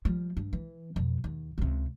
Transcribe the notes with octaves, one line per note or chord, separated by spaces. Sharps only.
F3 G3
G2
E3
F2 B2
D#2
C#2 C3